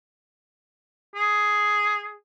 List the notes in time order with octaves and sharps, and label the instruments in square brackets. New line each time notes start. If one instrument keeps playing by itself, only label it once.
[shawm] G#4